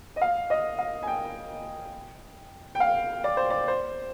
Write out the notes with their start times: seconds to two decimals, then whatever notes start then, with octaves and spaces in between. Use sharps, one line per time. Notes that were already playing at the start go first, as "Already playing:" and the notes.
0.16 D#5
0.21 F5
0.50 D#5
0.78 F5
1.03 G#5
1.07 G5
2.75 G5
2.80 F5
3.24 D5
3.37 C5
3.50 D5
3.68 C5